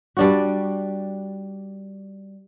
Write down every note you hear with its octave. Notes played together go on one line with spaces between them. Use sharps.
G3 D4 F#4